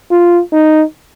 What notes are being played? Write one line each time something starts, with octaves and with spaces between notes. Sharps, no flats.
F4
D#4